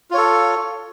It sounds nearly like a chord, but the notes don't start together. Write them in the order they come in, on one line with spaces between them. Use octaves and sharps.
F4 C#5 A4